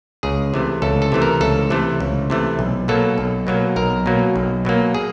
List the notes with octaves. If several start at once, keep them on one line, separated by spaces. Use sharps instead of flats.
C#2 G#4
C3 E3 A3
C#2 A4
A4
C3 E3 A3
A#4
C#2 A4
C3 E3 A3
C#2
C3 E3 A3
B1
B2 F#3 A#3 A4
B1
B2 F#3 A#3
B1 A#4
B2 F#3 A#3
B1
B2 F#3 A#3
G#4